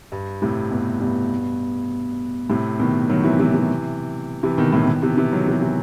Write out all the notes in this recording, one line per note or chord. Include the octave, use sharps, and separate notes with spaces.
G2
A2 C3
G2 B2
G2 B2
A2 C3
B2 D#3
D#3 F#3
C3 E3
C3 E3
C3 E3
C3 E3
B2 D#3
A2 C3
B2 D#3
C3 E3
C3 E3
D#3 F#3
C3 E3
C3 E3